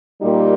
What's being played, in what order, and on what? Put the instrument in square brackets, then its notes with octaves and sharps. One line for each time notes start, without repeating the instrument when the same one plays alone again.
[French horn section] A#2 G3 A#3 D#4 G4